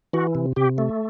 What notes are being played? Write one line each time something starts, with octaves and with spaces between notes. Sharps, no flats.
E3 F#4
C3
C3 G4
A3